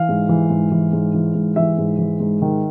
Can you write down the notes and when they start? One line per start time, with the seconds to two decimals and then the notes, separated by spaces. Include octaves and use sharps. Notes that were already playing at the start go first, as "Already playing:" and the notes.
Already playing: E3 F5
0.09 G#2
0.29 E3
0.50 G#2
0.72 E3
0.93 G#2
1.14 E3
1.35 G#2
1.56 E3 E5
1.78 G#2
1.99 E3
2.20 G#2
2.42 D#3